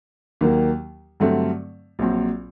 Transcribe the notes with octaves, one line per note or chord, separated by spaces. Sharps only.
D#2 D#3 F#3 A#3
G2 D3 F#3 A3 C4
A#1 A#2 F#3 C4